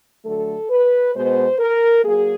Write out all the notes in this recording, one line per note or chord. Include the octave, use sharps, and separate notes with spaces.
D3 F#3 A3 A4
B4
B2 G#3 B3 C5
A#4
F#3 A#3 G#4